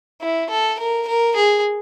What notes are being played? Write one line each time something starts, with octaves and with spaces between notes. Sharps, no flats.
E4
A4
A#4
A#4
G#4